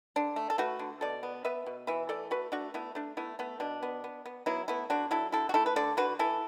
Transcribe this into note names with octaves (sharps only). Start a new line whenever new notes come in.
D3 D4
A3
A4
A3 F#4 B4
D3
B2 A4 D5
B3
B3 B4 E5
B2
E3 B4 E5
A3 A4 D5
A3 F#4 B4
A3 D4 F#4
A3 B3 E4
A3 D4
A3 B3 E4
A3 B3
B2 D4
B3
B3
B3
F#3 B3 E4
A3 B3 E4
D3 D4 F#4
F#3 E4 A4
D3 E4 A4
F#4
A3 E4 A4
B4
D3 A4 D5
D3 F#4 B4
E3 E4 A4